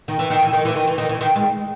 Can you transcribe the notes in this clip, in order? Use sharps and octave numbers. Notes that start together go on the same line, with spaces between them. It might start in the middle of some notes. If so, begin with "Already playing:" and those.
D#3
E3
D#3
E3
D#3
E3
D#3
E3
D#3
E3
D#3
G#3